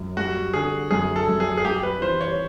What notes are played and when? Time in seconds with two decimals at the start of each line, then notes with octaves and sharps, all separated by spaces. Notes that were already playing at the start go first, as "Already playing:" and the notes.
Already playing: F#2
0.17 G3 F#4
0.53 D3 G#4
0.91 F#2 G#4
1.16 A4
1.28 F#2
1.40 G#4
1.57 G#4
1.64 G3 G4
1.83 B4
2.02 E3 C5
2.21 C#5